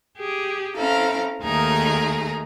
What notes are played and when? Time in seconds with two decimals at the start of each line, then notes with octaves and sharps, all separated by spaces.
0.17 G4 G#4
0.75 C4 C#4 E4 A4 F5 A#5
1.42 D#2 D#3 A3 G#4 A#5